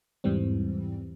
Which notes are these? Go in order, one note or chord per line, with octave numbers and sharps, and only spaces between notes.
E2 G#2 E3 G3 C4